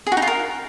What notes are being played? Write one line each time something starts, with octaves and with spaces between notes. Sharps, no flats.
G#4
F#4
D#4
F4
A#4